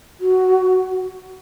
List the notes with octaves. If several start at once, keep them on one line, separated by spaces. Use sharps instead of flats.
F#4